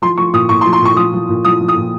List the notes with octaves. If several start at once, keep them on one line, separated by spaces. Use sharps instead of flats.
F3 C6
F3 C#6
A#2 D#6
A#2 C#6
C6
F3
C6
A#2 C#6
F3 D#6
F3
A#2
F3 D#6
F3
D#6
A#2